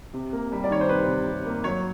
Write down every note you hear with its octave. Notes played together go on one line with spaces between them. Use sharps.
C3
A#3
G3
D5
D#3 C#5
C5
C3 B4
C3
C3
A#3
F#3 C#5